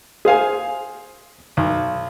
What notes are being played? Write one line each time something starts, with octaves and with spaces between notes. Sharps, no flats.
G#4 C5 F5 G#5
B1